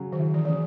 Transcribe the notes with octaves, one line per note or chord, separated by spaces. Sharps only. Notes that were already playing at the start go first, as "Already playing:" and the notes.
Already playing: C#3 F#3
D#3
E4
E3
C#3 E3